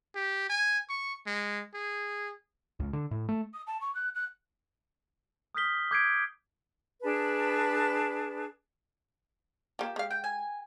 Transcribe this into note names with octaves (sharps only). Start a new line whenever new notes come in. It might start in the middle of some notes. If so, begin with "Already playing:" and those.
G4
G#5
C#6
G#3
G#4
C#2
D3
A2
A3
D#6
A5
C#6
F#6
F#6
D#6 F6 G6 B6 G7
D6 G6 G#6 B6 C7 D7
D4 G#4 B4 A5
A#3 F4 G4
G#3 F5
G5
G#5